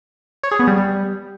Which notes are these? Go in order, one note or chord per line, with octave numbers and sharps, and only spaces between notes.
C#5
G#4
B3
G3